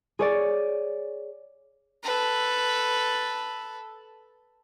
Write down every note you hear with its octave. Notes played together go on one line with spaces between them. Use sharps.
G#4 C#5 D5
A4 B4